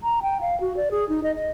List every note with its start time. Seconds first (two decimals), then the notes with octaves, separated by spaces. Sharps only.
0.03 A#5
0.22 G5
0.41 F5
0.60 F#4
0.77 D5
0.91 G#4
1.09 D#4
1.23 D#5
1.35 D#5